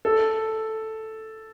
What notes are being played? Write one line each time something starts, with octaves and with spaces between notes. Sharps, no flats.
A4